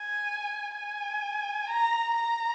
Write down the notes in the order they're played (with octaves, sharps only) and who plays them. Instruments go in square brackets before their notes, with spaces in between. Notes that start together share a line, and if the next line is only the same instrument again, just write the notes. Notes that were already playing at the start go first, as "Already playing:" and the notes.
Already playing: [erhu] G#5
G#5
A#5
A#5